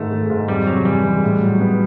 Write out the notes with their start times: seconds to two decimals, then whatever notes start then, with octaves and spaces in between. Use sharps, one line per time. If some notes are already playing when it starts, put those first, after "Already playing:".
Already playing: G#2 D#3 A3 D#4
0.12 G#3
0.30 G#2
0.48 F2 G3
0.67 C3 F#3
0.85 E3 G3
1.04 G#3
1.23 A2
1.41 F#3
1.60 B3